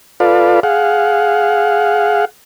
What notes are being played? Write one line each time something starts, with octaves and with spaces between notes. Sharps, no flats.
F4 A4 B4 D5 F5
G#4 F5 F#5